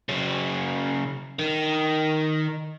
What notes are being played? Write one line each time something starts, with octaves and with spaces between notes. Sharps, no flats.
C#3 F#3
D#3